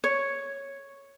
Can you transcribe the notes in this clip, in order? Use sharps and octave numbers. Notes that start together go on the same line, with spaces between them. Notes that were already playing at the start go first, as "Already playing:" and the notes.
C#5